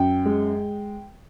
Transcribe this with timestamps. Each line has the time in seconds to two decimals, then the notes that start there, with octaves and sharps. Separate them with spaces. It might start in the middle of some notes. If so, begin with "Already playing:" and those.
Already playing: F#2 G5
0.26 G#3